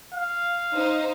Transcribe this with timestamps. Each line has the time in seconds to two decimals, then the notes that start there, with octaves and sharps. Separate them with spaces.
0.13 F5
0.73 D#4 C5